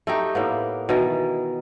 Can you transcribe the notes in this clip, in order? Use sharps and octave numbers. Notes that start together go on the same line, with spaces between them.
A3 D#4 G4
A2 A#3 B3
B2 D#3 E3